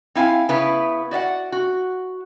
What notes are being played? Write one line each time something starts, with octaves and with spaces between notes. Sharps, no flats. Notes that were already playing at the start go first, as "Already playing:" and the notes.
C4 E4 F5 G#5
C#3 B3 E4 B4
F#4 D5 E5 F#5
F#4